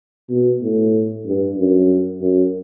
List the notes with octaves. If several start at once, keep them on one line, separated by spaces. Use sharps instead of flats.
B2
A2
G2
F#2
F#2